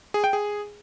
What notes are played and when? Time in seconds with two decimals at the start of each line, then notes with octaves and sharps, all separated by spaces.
0.14 G#4
0.24 G5
0.33 G#4